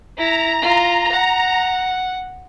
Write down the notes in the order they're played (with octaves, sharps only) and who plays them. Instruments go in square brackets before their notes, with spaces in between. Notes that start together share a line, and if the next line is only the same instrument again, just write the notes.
[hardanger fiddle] E4 [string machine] A#5
[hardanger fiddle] F4
F#5